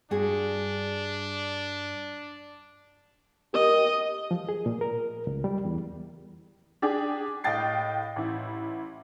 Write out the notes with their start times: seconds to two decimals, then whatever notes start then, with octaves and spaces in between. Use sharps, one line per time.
0.11 G2 D4 F#4 G#4
3.54 G4 A#4 D#5
4.31 F3
4.49 G#4
4.66 A#2
4.81 A#4
5.27 C#2
5.44 G3
5.65 E2
6.82 D4 G4 G#4 D5
7.44 A2 D#5 F5 G5 A6 C7
8.16 A1 E4